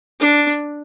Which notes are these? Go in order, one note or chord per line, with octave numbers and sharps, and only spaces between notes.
D4